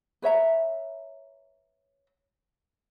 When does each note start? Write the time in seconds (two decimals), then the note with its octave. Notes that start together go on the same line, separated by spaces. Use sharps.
0.22 B4 C#5 E5 A#5